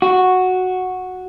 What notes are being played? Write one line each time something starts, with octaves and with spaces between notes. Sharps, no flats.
F#4